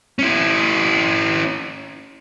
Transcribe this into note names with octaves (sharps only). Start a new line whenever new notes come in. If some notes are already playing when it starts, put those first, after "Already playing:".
C#4 E4